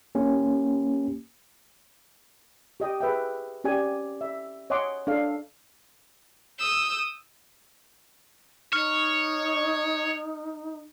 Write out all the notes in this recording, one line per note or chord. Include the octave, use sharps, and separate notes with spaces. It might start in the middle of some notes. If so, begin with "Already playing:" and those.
A#3 C#4 G4
G4 D#5 G5 D#6
G#4 B4 E5 G5
C#4 G4 D5 G#5
E5
C#5 D#5 F#5 G#5 C6 D6
D4 A4 F5
D#6 E6 G6
D#4 C#5 F6